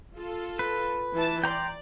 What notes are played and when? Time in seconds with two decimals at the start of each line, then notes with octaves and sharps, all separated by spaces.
0.16 F4 A4
0.59 B4
1.14 E3 A5
1.44 D5 G5 A#5 C6